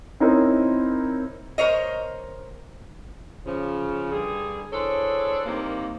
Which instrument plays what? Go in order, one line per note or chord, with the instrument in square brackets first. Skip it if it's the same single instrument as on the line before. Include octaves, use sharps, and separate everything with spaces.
[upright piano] C4 C#4 D#4 E4 A#4 C5
[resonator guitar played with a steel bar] A#4 C5 C#5 D#5
[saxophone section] C#3 F3
G2 D3 G3 G#4
D4 E4 G#4 A4 C5 C#5
C3 D#3 G3 A#3